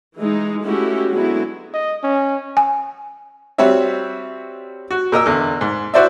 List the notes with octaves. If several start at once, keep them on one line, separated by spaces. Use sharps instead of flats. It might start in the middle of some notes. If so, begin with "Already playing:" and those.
E3 G#3 D#4
G#3 A3 C#4 E4 F#4 G4
D3 F#3 G#3 B3 E4
D#5
C#4
G#5
G3 C4 F#4 C#5 E5
F#4
A#2 A#4 D#5 E6
E2 D3
G#2
E4 F#4 C5 D5 E5